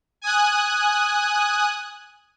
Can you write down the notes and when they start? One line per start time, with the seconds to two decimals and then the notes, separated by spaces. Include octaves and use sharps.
0.22 G#5 D#6 F#6